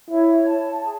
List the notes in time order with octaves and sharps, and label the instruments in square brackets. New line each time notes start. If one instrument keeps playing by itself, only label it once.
[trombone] E4 [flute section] C#5
[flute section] A5
G#4